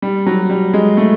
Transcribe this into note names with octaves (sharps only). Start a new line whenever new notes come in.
G3
F#3
G3
G#3
A3